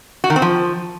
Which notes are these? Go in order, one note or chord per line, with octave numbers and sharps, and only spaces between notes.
F#4
D#3
C4
F3